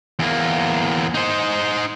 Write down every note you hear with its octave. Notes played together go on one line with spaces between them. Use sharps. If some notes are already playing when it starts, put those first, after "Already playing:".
E2 A#3
D#4 C5